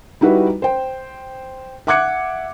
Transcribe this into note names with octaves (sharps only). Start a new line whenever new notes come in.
G3 D#4 E4 F#4 B4
C5 G5
E5 F#5 D6 F#6 G#6 C#7